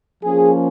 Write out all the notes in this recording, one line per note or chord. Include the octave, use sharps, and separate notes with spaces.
F3 A#3 C#4 G#4